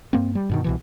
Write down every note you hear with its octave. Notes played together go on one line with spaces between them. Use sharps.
G2 A#3 C4
G3
G2 B2 D#3
C2 B2 E3